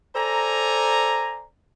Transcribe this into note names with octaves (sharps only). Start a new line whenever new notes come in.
A4 C5 D5 G#5 A#5